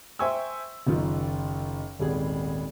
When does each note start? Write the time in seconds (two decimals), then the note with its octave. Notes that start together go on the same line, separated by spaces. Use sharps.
0.19 C5 E5 G5 G#5 C#6 E6
0.87 F#1 D#3 F4
1.99 D#1 G#1 G#4